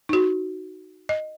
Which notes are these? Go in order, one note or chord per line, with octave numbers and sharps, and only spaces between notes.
D#4
F#4
D#5